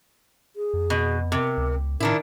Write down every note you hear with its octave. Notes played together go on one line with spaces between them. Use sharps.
G#4
F2
B2
C3 A#4
C#2
A2 D#3 D4 E4 A#4